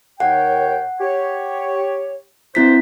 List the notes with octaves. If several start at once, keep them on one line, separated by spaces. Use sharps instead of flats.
D#2 C#5 F#5 G5
G4 C#5
G2 C4 E4 C5 B6